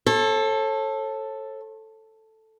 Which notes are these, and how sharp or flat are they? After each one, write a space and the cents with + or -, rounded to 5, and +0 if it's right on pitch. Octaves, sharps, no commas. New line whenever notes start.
A4 +0 C#5 -45